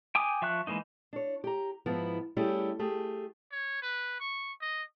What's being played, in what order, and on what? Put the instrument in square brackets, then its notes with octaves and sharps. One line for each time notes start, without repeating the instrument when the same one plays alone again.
[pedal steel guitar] G5 G#5 D6 D#6
F3 E5 C#6 F#6
E3 G#3 A#3 D#4
[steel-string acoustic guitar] D4 C#5
G4 A#5
G#2 F3 B3 E4
G3 A3 C#4 E4 G4 G#4
A3 G4 G#4
[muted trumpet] C#5
B4
C#6
D#5